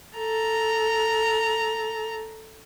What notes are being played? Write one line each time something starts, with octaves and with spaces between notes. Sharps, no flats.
A4 A#5